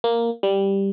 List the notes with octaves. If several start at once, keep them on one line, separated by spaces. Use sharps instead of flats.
A#3
G3